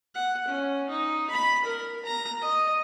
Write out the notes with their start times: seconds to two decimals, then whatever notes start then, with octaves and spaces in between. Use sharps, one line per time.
0.15 F#5
0.48 C#4
0.89 D#4
1.30 B5
1.65 A#4
2.06 A#5
2.41 D#5